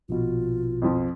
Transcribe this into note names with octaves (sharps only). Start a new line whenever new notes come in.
A#1 B2 F4
F2 F3